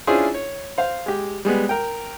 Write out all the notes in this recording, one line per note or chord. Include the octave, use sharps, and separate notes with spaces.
C#4 D4 E4 F4 G#4 C5
C#5
C5 F5
G#3 G4
G3 G#3 B3
A#4 G5